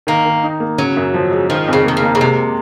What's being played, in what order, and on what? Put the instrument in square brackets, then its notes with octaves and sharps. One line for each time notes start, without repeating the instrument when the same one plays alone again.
[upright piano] D#3 [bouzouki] A#3
[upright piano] D#3
D#4
A#3
[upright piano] C#3 [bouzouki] F#3
[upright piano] F#2
F3
G#3
[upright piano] D#3 [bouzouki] F3
[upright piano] F2
[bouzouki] C#3
[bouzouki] D#3 [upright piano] A#3
[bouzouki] C#3
[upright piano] A#3
[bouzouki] C#3
[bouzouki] C3 [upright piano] G#3